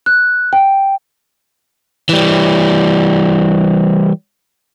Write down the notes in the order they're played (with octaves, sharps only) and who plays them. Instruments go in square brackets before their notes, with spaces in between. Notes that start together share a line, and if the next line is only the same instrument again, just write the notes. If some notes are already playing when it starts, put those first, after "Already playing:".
[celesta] F#6
G5
[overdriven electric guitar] E3 G3